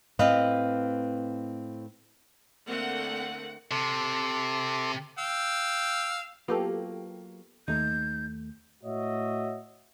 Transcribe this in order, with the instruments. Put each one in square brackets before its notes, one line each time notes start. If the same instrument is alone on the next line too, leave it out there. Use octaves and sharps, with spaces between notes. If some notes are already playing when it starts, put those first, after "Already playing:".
[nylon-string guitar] A2 C4 B4 D#5 F5
[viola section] D3 A3 A#3 C4 F#5
[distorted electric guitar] C3 [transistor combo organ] A4 C6 D6
[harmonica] F5 G5 E6
[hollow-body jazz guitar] F#3 A#3 F4 [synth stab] B3 G4 A4
[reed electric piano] D#2 A3 [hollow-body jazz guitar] D#4 [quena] G6
[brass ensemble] A2 F#4 C#5 D#5 E5